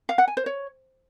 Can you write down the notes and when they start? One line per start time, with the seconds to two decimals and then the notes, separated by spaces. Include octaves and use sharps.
0.09 F5
0.18 F#5
0.28 G#5
0.37 C5
0.46 C#5